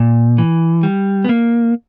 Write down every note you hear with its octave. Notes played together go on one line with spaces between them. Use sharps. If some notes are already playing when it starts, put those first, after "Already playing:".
Already playing: A#2
E3
G3
B3
A#3